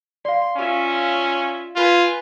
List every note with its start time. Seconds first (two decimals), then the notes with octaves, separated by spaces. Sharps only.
0.25 D5 F5 C6
0.57 C#4 F4 E5
1.76 F4 B4 G#5